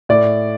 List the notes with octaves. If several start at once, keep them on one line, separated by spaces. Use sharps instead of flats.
A2 D5